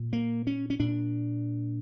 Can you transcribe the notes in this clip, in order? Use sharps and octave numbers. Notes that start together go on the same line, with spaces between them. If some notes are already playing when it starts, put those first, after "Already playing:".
Already playing: A#2
A#3
C#4
C#4
A#2 D4